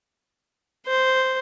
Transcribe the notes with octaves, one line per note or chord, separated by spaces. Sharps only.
C5